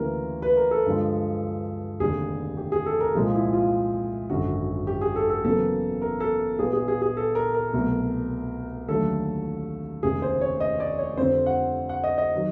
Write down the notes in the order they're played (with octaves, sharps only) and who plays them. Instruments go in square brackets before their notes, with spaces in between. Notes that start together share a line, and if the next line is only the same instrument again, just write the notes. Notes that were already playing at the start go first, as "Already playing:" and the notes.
Already playing: [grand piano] D2 C#3 E3 G3 A#3 A#4
B4
A#4
A4
G2 D3 F3 G#3
F1 D#2 D3 G3 G#4
G4
G#4
A4
A#4
C2 A#2 F3 G#3 G#4
E4
F4
G#1 F#2 D3 F#4
G4
G#4
A4
A4
E2 C#3 F#3 A#3 A4
A#4
A4
A#1 A#2 G3 B3 G#4
G#4
G#4
G#4
A4
A#4
A#4
C2 B2 F#3 A3
D#2 D3 F#3 A3 A4
F1 D#2 C#3 G#4
C5
C#5
D#5
D5
C#5
F2 D3 G3 C4 C5
F#5
F#5
D#5
D#5
D#3 F#3